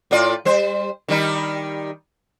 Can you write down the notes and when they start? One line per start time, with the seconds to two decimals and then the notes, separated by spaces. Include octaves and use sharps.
0.11 A2 F4 D5
0.45 G3 C5
1.08 D#3 G3 D#4